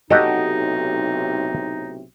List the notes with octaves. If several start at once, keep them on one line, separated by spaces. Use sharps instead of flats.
B1 A2 C3 D#4 F#4 G4 A4 D#5